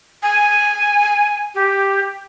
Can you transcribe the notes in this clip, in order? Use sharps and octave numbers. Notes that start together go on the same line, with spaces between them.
G#5
G4